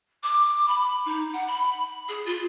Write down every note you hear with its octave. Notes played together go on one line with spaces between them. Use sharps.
D6
B5
D#4
F#5
B5
G#4
F4